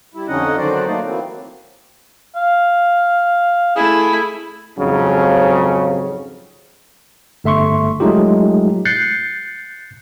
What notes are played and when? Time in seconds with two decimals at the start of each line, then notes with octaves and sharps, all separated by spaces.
0.14 G3 E4
0.28 F2 D3 C#4 D#4 D#5 F#5
0.57 D3 D#3 F#3 F#4 C5 D5
0.87 A3 A#3 D#4 C5 D5
1.04 E3 F#3 A#3 C4
2.36 F5
3.76 A3 E4 G#4
4.78 F2 G#2 C#3 F#3 C#4
7.44 G1 A3 E5 C6 C#6
8.00 F#3 G#3 A3 D#4 F4 G4
8.85 F#6 G6 A6 C7 C#7